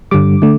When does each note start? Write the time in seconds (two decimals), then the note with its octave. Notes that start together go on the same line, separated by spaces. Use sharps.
0.11 G2 D3 G3 D6
0.42 D3 A3